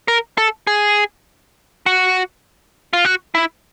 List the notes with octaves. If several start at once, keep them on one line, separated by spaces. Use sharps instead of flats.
A#4
A4
G#4
F#4
F4
F#4
E4